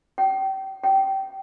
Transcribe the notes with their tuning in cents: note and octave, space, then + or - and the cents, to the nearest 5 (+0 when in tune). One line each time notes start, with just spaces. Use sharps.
G5 -30
G5 -20